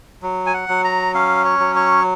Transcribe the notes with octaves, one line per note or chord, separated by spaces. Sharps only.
F#3
G#5
F#5
F#3
A#5
C#4 F5
C#5
F#3
C#5